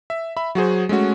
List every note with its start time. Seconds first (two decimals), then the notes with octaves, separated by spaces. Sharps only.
0.10 E5
0.37 E5 B5
0.55 F#3 F#4 G#4 C5
0.89 G#3 A3 C#4 F#4